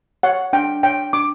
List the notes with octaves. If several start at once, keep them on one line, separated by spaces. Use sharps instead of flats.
C#5 F#5
D4 G5
C#5 G5
D4 D6